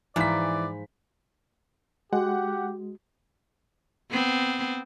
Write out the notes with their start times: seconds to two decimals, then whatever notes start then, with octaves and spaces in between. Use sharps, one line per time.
0.16 G#2 E3 F3 D5 B6
2.13 G#3 F#4 G4 F#5
4.11 B3 C4